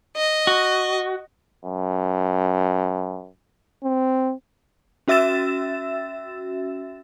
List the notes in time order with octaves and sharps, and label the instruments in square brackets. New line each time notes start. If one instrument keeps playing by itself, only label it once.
[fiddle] D#5
[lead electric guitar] F#4
[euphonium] F#2
C4
[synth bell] C#4 F#4 E5 E6 A6 E7